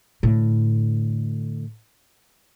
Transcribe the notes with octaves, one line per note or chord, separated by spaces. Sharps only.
A2 D3